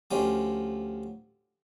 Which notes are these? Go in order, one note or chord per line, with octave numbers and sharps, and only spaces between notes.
D2 F3 C#4 G4